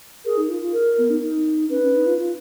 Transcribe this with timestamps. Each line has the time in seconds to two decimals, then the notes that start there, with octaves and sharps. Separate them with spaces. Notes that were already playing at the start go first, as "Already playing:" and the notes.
0.25 G#4 A#4
0.37 D#4
0.49 F4
0.61 F4
0.73 A#4
0.98 B3
1.10 D#4
1.22 D#4
1.69 C#4 B4
1.82 C#4
1.94 D#4
2.06 F4
2.19 F4